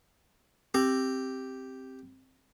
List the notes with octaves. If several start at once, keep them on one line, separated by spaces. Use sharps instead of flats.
C4 G4